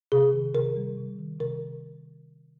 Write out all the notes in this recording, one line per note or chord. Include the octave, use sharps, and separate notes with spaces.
C3 G#4
D#3
C3 A#4
G3
C3
D#3
C3 A#4